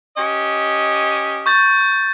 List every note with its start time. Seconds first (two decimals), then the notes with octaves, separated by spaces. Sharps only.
0.16 C#4 G4 D#5
1.46 C#6 G6 A6